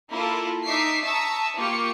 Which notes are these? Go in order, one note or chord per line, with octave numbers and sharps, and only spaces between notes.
A#3 E4 F4 A4
D#4 E5 C#6 D6 B6 C7
E5 A5 A#5 C#6 D#6 E6
A#3 F4 G4 C#6 C#7